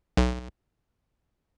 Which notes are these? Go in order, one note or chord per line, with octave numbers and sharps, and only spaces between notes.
B1